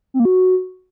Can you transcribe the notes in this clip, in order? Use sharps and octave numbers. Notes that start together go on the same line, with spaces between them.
C4
A#3
F#4